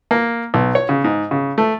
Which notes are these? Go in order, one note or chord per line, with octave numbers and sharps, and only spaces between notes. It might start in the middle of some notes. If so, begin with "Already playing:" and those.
A#3
B1
C#5
C#3
G#2
C#3
A3